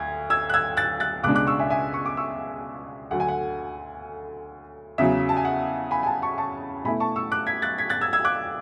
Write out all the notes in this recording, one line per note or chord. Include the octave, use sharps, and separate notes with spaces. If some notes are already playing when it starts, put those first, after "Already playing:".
Already playing: D2 G#6
E6 G#6
F#6
E6 G#6
F#6 A6
F#6 A6
C#2 B2 G#3 D4 D6 F#6
D6 F#6
C#6 E6
E5 G#5
E5 G#5
C#6
D6
C#6 E6
D2 D3 F#3 F#5
G#5
F#5
E2 C#3 F#3 E5
A5
G#5
F#5
G#5 B5
G#5
F#5 A5
A5 C#6
A5 C#6
B2 A3 E4 G#5 B5
A5 C#6
C#6 E6
D6 F#6
G#6 B6
F#6 A6
G#6 B6
F#6 A6
E6 G#6
E6 G#6
D6 F#6